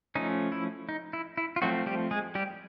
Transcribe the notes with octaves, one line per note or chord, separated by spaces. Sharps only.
F3 A3 C#4 D#4
E4
D#4
E4
E4
F4
F3 F#3 A3 C4 F#4
G3 G4
G#3 G#4
G3 G4